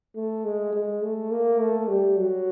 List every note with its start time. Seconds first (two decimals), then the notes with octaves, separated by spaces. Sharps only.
0.16 A3
0.45 G#3
0.74 G#3
1.02 A3
1.31 A#3
1.59 A3
1.88 G3
2.17 F#3